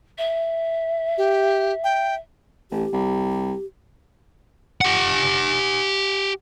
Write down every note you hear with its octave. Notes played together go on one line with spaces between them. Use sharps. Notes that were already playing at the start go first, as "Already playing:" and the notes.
E5
G4
G5
A1 G4
C2
G4 F#5